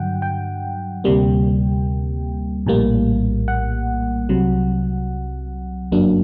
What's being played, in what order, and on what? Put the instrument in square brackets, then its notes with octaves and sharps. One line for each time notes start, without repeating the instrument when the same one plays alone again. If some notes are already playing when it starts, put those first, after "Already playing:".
Already playing: [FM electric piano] G2 D3 F#3 F#5 G5
G5
D2 C3 G3 A#3
A#1 A2 G3 A#3
F#5
C2 C3 F#3
G1 F#2 F#3 A#3 D4